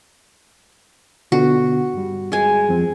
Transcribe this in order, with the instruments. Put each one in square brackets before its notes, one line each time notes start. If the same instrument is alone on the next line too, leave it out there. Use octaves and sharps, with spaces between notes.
[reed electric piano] B2 D3 B3 [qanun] F#4
[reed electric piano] G2 G3
[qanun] G#3 G#5
[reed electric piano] F2 F3 C4